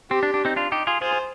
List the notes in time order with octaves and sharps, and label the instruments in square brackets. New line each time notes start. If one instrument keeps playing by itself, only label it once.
[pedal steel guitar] C4 [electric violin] G4
[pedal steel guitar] D4
D4
C4 D#4
D4 F4
D#4 G4
F4 G#4
[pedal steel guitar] F4 G#4 [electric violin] C5